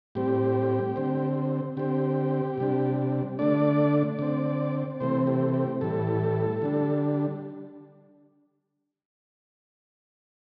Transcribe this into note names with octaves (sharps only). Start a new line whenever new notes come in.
A2 G3 C4 G4
D3 C4
D3 C4 G4
C3 G3 D4
D3 A3 D4 D5
D3 C4 D5
C3 E3 A3 C4 C5
G4
G4
A2 E3 G3 A4
D3 G3 D4